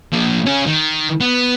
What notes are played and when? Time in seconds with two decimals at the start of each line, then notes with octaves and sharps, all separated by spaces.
0.12 A#2 F3
0.46 C#4 G#4
0.66 D#3
1.20 B3